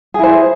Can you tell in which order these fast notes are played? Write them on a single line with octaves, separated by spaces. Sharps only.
G#4 E4 C5